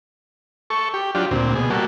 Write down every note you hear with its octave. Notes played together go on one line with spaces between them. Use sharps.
A4 C#6
G4
F#3 D4 F4 G4
D2 A#2 C4
B2 G#4
G3 A#3 F#4 A4